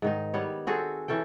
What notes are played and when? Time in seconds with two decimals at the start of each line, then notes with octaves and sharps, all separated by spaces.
0.02 G#2 D#3 D#4
0.34 G3 B3 C#5
0.67 C4 F#4 G#4 A4
1.08 E3 C#4 A4 G5